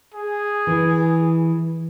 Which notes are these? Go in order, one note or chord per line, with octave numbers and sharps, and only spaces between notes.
G#4
E3